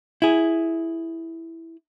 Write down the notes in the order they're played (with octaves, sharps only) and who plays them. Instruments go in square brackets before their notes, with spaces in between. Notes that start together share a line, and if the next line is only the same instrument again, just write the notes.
[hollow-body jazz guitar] E4 G#4